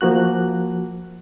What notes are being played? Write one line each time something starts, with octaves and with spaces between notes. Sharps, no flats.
F3 A#3 F#4 F#6